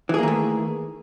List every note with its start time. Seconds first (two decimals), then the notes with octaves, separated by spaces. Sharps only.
0.09 E3
0.14 G#4
0.18 A#3
0.23 D#3
0.28 A3